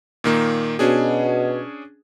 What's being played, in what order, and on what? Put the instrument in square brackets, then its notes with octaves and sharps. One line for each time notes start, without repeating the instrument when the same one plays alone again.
[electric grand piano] A#2 D#3 A#3
[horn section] B2 [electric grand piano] C#4 D4 G#4